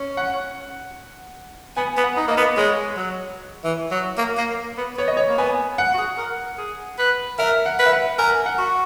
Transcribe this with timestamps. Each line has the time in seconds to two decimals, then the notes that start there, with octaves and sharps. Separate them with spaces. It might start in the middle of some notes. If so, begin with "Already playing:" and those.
Already playing: C#4
0.17 F#5
1.77 B3 G#5
1.97 B3
2.04 F#5
2.17 D#4
2.28 A#3 D#5
2.37 B3
2.57 G#3 C#5
2.97 F#3
3.64 E3
3.91 F#3
4.18 A#3
4.38 A#3
4.77 B3
4.98 B3 C#5
5.08 D#5
5.17 C#5
5.29 A#3
5.38 B3 G#5
5.78 F#5
5.94 F#4
5.98 G#4
6.18 A#4
6.58 G#4
6.99 B4
7.39 A#4 E5
7.66 F#5
7.79 B4
7.86 E5
7.93 F#5
8.19 A#4 G#5
8.46 F#5
8.58 F#4